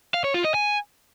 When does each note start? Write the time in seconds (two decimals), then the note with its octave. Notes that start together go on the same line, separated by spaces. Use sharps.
0.14 F5
0.24 C#5
0.34 F4
0.44 D#5
0.54 G#5